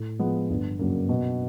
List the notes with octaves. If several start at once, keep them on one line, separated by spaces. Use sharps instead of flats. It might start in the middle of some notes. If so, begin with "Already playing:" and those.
Already playing: A2
F3 G#3 B3
G1
F#2 C#3 F#3 A#3
B2